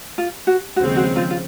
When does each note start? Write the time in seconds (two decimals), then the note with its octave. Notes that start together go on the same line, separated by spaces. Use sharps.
0.18 F4
0.47 F#4
0.76 D#2 C#3 F3 G#3 C4 F#4
0.96 F#4
1.16 F4
1.30 F4